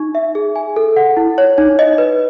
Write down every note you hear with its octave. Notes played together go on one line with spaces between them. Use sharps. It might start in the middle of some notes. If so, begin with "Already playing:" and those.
Already playing: D#4 C#6
E5
G#4
G#5
A4
F#5
E4
C#5
D#4
D#5
B4